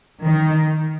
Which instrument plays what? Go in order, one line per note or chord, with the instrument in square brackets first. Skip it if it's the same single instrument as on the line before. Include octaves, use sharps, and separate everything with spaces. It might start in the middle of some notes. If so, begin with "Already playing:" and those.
[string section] D#3